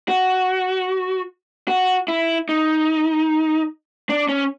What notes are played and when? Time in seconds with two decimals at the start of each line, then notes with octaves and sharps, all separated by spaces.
0.08 F#4
1.68 F#4
2.08 E4
2.49 D#4
4.09 D4
4.29 C#4